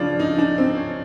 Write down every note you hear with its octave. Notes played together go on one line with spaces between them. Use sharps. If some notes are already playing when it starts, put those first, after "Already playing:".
Already playing: C#3 F3 D4
D#4
D4
C4
C#4